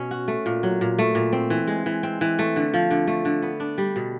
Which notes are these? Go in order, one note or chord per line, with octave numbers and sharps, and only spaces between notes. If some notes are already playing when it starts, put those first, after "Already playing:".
Already playing: B2 C#4
F#4
A3
A#2
F#3
A#2
A3
A#2
C4
E3
G#3
E3
C4
E3
A3
D3
F3
D3
A3
D3
B3
D4
G3
B2